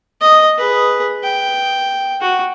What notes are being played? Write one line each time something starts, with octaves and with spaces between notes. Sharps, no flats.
D#5
G#4 B4
G5
F#4